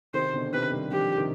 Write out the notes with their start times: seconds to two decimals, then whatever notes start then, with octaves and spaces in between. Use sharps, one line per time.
0.14 C3 D#3 C5
0.33 B2 D3
0.52 C3 D#3 B4
0.72 D#3 G3
0.91 D3 F3 G4
1.18 C3 D#3